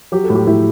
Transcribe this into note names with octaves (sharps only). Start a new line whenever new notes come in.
F#3 G4
A4
A2
G4
A2 E4